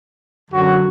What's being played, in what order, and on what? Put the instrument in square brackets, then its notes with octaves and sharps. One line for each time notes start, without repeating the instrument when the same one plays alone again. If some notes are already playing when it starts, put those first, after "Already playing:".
[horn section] F#2 D3 F#3 F#4